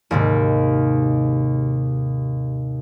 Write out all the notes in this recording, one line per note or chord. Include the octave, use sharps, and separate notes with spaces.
D#2 G#2 C3